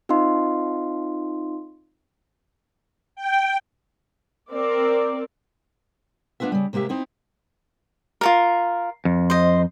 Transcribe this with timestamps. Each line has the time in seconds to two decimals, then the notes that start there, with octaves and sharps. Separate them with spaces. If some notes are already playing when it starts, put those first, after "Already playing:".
0.09 C4 D#4 F4 D#5 F5 C6
3.16 G5
4.51 C4 A#4 D5
6.40 A#3 B3 D4 F4 E5
6.52 C#3 G3
6.73 C3 G#3 A#3 G4 E5
6.89 C4 D#4 E4
8.21 F4 A4 A#4
9.05 F2
9.30 C5 D#5